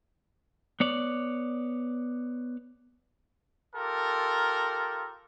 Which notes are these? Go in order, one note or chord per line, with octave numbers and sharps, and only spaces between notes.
B3 C#5 D5
F4 G4 A4 A#4